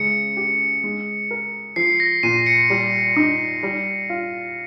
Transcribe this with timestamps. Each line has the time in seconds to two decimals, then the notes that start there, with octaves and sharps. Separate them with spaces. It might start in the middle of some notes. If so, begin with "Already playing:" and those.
Already playing: C#3 G#3 C#7
0.37 G4
0.84 G#3
1.31 A#4
1.76 F3 C7
2.00 A#6
2.23 A#2 D#7
2.46 C#7
2.70 G3
3.16 D#4
3.63 G3
4.10 F4